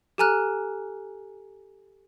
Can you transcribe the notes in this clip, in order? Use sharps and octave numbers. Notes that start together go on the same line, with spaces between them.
G4 A4 G#5 A#5 F6 F#6